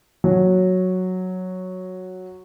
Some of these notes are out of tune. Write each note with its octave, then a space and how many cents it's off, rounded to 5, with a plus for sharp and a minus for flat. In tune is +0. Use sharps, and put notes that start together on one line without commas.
F#3 -5